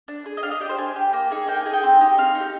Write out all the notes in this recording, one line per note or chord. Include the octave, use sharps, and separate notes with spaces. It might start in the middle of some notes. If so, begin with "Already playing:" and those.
D4
G#4
D#5
D4 F5
D#5
G4 D5
C5
D4 G#5
G4
A#3
D#4 G#4
A#3 G5
G#5
D#4 G#4
G5
C4
D#4 G4
C4 F5
D#4
G4